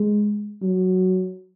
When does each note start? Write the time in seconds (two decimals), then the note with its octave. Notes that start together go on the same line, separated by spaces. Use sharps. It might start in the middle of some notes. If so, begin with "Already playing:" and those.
Already playing: G#3
0.62 F#3